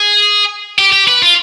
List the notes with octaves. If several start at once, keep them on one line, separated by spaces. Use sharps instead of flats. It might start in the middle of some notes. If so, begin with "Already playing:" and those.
Already playing: G#4
G4
G4
B4
F4